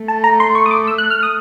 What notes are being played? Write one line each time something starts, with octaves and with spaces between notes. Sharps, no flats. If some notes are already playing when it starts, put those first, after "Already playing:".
Already playing: A3
A5
A#5
C6
C#6
D#6
D6
E6
F#6
F6
D#6